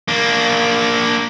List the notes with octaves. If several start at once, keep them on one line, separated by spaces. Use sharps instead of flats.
A#3 D4